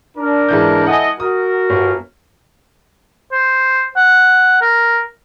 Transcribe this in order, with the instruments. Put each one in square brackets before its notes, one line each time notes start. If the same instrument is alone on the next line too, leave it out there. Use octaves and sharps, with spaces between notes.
[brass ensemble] D4 A#4
[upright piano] G#2 E3 G6
[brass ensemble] E4 A4 D#5 [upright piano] F#5 G#5
[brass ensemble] F#4 A#4 [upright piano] D#6
[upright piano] G1
[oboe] C5
F#5
A#4